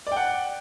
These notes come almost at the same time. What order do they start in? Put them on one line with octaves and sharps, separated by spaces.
D5 G5 F#5